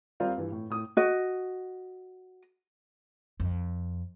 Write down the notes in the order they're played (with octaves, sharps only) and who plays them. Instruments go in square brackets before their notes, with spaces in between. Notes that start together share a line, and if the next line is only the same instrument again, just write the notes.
[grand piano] G3 C4 F4 A#4 D5 F5
G2 E3
A2
A2 D#6
[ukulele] F#4 D#5
[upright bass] F2